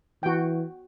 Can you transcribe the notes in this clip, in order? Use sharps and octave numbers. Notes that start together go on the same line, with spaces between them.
E3 F#4 G5